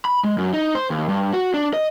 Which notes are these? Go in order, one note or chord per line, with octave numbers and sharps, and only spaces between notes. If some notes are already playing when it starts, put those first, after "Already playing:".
B5
G#3
F#2
D#4
C5
D#2
G2
F#4
D4
D#5